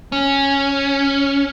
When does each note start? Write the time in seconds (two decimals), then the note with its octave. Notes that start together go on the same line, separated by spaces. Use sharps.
0.12 C#4